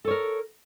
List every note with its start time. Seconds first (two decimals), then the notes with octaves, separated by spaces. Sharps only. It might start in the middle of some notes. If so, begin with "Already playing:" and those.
0.05 A4
0.08 C#5
0.11 A#4